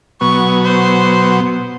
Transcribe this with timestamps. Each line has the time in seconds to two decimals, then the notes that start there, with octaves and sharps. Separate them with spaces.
0.21 B2 F#3 B3 C#6
0.63 C5